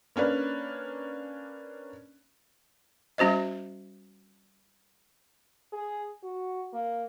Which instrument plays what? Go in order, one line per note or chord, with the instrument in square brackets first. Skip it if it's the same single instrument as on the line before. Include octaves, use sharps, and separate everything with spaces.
[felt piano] A#3 C#4 D4 B4
[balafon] G3 C#4 F#4 C5 D#5
[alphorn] G#4
F#4
A#3